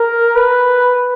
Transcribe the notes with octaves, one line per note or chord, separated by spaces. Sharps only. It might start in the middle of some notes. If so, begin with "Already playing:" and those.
Already playing: A#4
B4